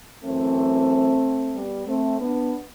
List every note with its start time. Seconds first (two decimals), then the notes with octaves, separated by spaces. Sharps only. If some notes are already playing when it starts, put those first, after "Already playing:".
0.24 F#2 E3 A3 C4
1.54 G3 B3
1.87 A3 C4
2.20 B3 D4